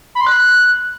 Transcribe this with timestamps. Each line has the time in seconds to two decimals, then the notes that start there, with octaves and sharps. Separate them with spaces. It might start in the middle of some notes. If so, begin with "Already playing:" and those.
0.15 B5
0.21 C6
0.27 F#6